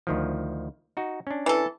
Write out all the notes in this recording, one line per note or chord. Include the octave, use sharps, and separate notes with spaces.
D2 D#3 F3
D#4 F#4
C#4 D4
E3 A4